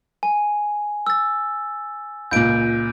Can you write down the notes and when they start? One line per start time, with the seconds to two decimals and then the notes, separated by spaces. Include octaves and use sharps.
0.23 G#5
1.07 E6 A6
2.31 C#2 A#2 G6 D7